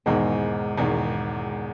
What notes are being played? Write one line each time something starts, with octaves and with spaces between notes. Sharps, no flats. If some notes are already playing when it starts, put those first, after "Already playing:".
E1 E2 G#2 D#3
E1 E2 D#3